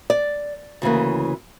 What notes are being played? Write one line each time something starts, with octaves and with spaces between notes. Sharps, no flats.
D5
D2 C#3 E3 A#3